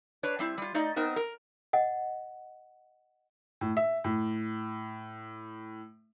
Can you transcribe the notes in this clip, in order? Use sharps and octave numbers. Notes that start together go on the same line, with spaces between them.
D4 B4 C#5
G3 C4 E4
G3 F4
A3 D#4 D5 D#5
B3 C4 D#4 A#4
A#4
D#5 F#5
A2
E5
A2